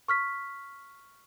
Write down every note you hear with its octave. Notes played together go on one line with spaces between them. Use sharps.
C#6 F6 B6